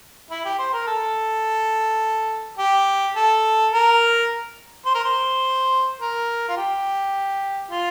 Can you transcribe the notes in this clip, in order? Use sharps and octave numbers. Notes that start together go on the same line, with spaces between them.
E4
G4
C5
A#4
A4
G4
A4
A#4
C5
A#4
C5
A#4
F4
G4
F4